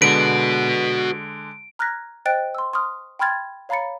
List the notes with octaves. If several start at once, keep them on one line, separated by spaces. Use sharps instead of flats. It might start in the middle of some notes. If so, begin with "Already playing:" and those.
D3 G#3 F#4 B4 D7
A#5 F6 F#6 G#6 A#6 B6
C5 D#5 G5 F#6 A6 D7
C6 E6
C6 C#6 D#6 F6
G5 B5 C6 F6 G#6 A6
C#5 F5 A#5 B5 A6 C#7